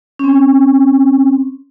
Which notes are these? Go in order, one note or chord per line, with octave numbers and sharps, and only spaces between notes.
C4 C#4